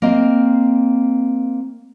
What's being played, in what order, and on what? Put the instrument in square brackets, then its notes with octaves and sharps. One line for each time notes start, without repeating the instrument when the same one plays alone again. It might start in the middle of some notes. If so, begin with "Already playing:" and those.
[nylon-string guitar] A#3 C4 D#5